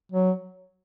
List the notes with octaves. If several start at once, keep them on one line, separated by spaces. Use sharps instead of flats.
F#3